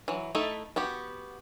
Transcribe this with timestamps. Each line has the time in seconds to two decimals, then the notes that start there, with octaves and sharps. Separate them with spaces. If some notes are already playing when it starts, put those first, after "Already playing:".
0.08 E3 F#3
0.35 A3 D#4 E4 A4
0.76 B3 F#4 G4